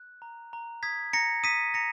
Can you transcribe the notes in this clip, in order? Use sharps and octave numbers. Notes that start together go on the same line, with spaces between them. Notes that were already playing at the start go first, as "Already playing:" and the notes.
Already playing: F#6
A#5
A#5
D#6 G#6 B6
A#5 A#6 C#7
D#6 B6 D#7
A#5 A#6 C#7